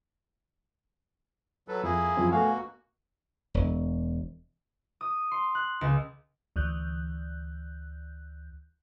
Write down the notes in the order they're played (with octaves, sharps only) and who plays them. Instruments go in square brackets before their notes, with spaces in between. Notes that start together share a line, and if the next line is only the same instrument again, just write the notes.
[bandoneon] F#3 A4 B4
[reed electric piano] F2 [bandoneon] A#3 E4 G#4
[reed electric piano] F#2 F3 C4
[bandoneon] B2 A#3 F#4 [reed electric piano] A3 F5 G#5
[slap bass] E1
[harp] D#6
C6
F#6
C#2
[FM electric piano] D2 E3 F#6 G6